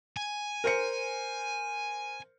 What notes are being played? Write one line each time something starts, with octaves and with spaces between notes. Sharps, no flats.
G#5
A#4 C5 C#7